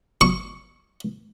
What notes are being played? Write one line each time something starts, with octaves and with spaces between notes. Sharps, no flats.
C#6